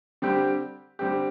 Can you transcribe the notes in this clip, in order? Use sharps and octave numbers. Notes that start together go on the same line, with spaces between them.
D3 G3 C4 G4
D3 G3 C4 G4